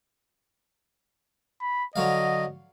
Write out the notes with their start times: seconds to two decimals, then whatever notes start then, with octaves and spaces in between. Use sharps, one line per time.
1.61 B5
1.96 D3 F#3 D#5 F5